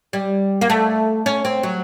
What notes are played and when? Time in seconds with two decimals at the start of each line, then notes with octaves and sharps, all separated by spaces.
0.13 G3
0.61 A#3
0.70 A3
1.26 C#4
1.45 C4
1.63 F#3